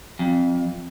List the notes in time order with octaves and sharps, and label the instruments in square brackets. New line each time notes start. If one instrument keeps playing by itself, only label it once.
[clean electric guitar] F2